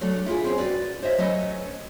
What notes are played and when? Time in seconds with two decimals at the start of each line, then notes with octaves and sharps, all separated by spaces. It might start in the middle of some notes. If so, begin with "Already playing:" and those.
0.01 F#3 A3 D4
0.26 E4 F4 G4 G#4
0.44 C4 C#4
0.58 F#4 B4 D5
1.02 C5 C#5 D#5 E5
1.18 F#3 A3 C#4 B4 D#5